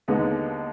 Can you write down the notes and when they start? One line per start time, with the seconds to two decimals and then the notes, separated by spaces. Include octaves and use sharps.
0.08 D#2 D3 G#3 B3 D#4